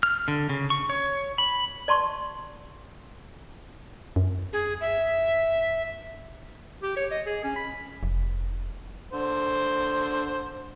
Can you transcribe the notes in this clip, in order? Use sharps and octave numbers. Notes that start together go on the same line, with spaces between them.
F6
D3
C#3
C#6
C#5
B5
D5 A5 C6 C#6
F#2
G#4
E5
G4
C#5
D#5
G#4
C#4
B5
F1
D3 C5